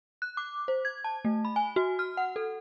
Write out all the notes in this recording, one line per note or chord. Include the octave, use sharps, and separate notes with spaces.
F#6
D6
C5
G#6
A5
A3
B5
G#5
F#4
F6
F#5
A4